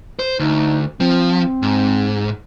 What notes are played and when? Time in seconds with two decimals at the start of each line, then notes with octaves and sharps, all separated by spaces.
0.19 C5
0.39 D2 D#4
1.00 F3 C4
1.62 G#2